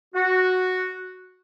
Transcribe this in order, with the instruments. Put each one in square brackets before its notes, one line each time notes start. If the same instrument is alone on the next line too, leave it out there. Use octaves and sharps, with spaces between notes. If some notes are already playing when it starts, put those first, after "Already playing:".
[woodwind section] F#4